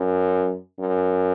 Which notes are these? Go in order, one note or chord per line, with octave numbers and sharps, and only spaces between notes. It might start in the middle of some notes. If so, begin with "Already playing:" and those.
Already playing: F#2
F#2